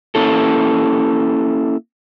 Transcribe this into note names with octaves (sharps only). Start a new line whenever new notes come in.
A#3 C#4 E4 A4